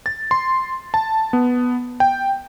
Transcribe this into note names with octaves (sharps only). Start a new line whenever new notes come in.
A6
C6
A5
B3
G5